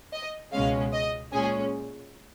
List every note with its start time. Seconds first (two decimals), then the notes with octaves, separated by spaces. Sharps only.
0.13 D#5
0.53 C#2 B2 G#3 C#4 F5
0.93 D#5
1.33 A#2 G#3 C#4 G#4